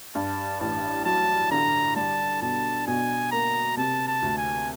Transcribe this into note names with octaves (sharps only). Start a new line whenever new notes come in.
G2 A5
A1 A5
F#3 A5
D3 A#5
G3 A5
B2 A5
B2 G#5
A#3 A#5
C3 A5
A5
D2
G#5